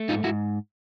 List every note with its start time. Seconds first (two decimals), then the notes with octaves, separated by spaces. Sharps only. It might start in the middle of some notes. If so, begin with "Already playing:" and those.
Already playing: A3
0.09 G#2 D#4 F4
0.24 G#2 E4 F#4